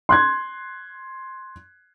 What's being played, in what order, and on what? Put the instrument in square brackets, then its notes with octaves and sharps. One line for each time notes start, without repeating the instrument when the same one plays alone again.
[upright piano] C6 F#6 G#6